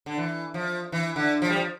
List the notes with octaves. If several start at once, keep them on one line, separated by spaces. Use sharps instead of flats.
D3
E3
F3
E3
D3
F3
G3
F3